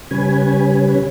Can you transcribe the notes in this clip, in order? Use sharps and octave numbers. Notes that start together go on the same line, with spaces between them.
C#3 G3 C#4 B4 G#5